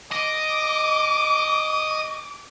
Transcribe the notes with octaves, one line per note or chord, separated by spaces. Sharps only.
D#5 D6